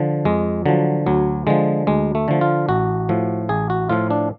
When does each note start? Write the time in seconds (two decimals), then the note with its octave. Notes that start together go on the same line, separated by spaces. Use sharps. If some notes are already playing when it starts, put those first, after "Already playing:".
Already playing: D3 F3
0.25 F2 G#3
0.66 D3 F3 F#3
1.06 D2 F#3
1.47 D3 F3 G#3
1.87 D2 G#3
2.15 A3
2.28 D3 F3
2.41 F4
2.69 A1 F#4
3.09 A2 F3
3.49 A1 G#4
3.70 F#4
3.89 A2 F3 F4
4.10 D4